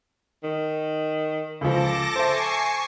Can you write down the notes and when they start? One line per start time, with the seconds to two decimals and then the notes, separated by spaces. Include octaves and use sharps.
0.43 D#3
1.61 C#2 F3 A4 A5 D6 A#6
2.16 C5 E5 G#5 C#6 C7